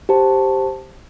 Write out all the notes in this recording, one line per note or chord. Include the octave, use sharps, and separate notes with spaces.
G4 C5 A5